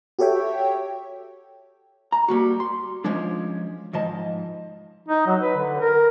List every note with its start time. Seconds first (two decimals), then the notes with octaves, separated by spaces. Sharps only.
0.19 F#4 G4 A4 C#5 E5 G5
2.12 A#5
2.28 G3 A#3 F#4
2.60 C6
3.04 F3 G#3 C#4 D4
3.93 G#2 F3 D#5 A5
5.08 D#4
5.27 F#3
5.40 B4
5.57 D3
5.80 A#4